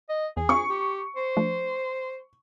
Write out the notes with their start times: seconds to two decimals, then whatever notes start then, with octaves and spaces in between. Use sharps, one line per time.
0.09 D#5
0.37 E2 G#4
0.49 C4 D4 F4 C#6
0.69 G4
1.16 C5
1.37 F3 A3 D4